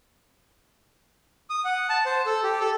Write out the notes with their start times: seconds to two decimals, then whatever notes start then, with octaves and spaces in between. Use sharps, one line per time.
1.50 D#6
1.65 F#5
1.89 A5
2.06 C5
2.26 A4
2.43 G4
2.60 A4